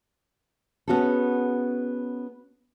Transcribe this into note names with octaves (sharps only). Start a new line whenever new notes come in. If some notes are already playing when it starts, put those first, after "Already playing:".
B3 C#4 F#4 G#4 A4